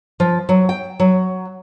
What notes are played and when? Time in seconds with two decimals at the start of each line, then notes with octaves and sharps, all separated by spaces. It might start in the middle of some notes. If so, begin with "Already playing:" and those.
0.20 F3
0.49 F#3
0.69 G5
1.00 F#3